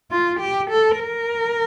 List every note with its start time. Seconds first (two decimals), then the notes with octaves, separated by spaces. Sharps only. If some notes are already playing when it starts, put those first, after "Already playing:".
0.11 F4
0.40 G4
0.70 A4
0.99 A#4